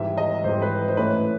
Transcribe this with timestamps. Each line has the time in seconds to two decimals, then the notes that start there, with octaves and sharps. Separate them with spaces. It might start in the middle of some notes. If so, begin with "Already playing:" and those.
Already playing: G#1 G#2 E3 G3 E5
0.17 D#5
0.44 G#1 G#2 E3 G3 C5
0.62 B4
0.88 C5
0.97 A1 A2 E3 A3 C#4 B4